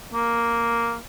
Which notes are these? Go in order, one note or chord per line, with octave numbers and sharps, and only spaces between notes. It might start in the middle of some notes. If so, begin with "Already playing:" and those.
A#3